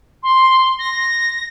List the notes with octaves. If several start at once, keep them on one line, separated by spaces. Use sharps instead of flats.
C6
A#6